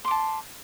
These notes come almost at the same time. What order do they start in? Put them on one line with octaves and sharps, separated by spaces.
C6 D6 A5